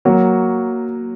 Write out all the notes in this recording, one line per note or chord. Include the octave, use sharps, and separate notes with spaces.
F#3 A#3 F#4